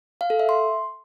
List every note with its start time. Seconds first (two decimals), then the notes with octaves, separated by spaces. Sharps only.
0.21 F5
0.30 A4
0.39 E5
0.49 C6